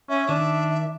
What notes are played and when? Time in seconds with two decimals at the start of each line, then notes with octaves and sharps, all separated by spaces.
0.09 C#4 E5
0.29 D#3 D4